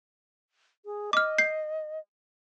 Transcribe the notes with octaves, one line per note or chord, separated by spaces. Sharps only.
G#4
D#5 D6 F6
G6 C7